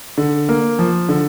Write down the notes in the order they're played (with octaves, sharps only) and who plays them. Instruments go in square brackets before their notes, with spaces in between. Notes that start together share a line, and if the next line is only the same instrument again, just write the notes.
[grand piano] D3
A#3
F3
D3